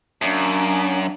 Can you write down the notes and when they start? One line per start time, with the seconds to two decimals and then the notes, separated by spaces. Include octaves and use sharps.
0.22 F#2 A#3 D4